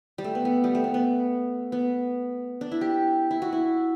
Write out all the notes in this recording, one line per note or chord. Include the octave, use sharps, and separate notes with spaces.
G3
A3
B3
B3
G3
A3
B3
B3
B3
D4
E4
G4
E4
F#4
E4